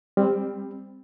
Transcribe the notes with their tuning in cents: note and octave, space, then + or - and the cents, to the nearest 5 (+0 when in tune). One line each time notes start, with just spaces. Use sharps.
G3 +20 C4 +0